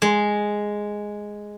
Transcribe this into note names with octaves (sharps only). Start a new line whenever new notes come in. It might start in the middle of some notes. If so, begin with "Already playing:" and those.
G#3